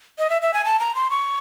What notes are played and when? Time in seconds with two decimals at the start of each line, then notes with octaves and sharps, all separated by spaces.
0.19 D#5
0.30 E5
0.42 E5
0.54 G#5
0.65 A5
0.79 A#5
0.95 C6
1.10 C#6